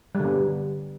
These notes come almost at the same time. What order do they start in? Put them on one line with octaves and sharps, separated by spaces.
G3 D3 B3